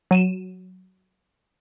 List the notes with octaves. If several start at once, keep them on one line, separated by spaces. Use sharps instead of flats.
F#3 D#7 E7